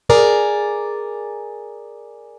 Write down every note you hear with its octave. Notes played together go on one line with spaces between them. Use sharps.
G#4 A#4 D5